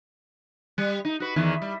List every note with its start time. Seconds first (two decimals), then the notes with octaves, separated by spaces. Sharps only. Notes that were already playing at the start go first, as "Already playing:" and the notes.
0.78 G3
1.05 D#4
1.20 F#4 B4
1.36 E2 D#3 E3
1.62 G3